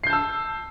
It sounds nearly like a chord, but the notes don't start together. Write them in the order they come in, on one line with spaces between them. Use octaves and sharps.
C7 G6 A5 E6